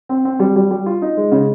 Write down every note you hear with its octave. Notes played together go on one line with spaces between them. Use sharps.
C4
C4
G3
G3
G3
F4
D#4
G#3
C#3